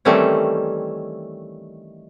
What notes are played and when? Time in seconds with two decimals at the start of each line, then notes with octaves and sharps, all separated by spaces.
0.05 D#3 E3 G3 A3 C4 C#4